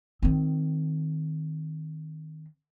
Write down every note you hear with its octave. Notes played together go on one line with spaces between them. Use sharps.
D#3 C4